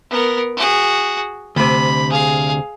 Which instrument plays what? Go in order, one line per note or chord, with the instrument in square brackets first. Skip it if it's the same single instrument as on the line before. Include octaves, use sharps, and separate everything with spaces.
[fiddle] B3 A#4
F#4 G#4
[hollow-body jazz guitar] D2 C3 [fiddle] B5
[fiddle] G#4 F5